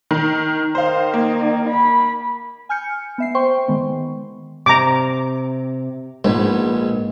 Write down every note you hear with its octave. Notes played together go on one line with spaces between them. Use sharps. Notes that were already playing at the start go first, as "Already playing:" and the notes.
D#3
D#3 C5 F5
A#3
B5
G#5 F6 G6 C#7
B3 E5 C7
C5 G5 C6 C#6
D#3 G#3 B3
C3 A#5 D6
A#1 G#2 G#3 B3